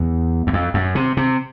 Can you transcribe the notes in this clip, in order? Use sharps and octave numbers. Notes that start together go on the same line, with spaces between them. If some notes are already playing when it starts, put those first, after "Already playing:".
Already playing: E2
E2
F2
F#2
C3
C3